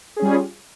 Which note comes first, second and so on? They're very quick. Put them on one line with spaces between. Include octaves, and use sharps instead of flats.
G#4 C#4 G3 F4